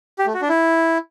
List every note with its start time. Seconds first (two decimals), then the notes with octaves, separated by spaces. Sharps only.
0.19 G4
0.26 A3
0.34 F#4
0.42 D4
0.49 E4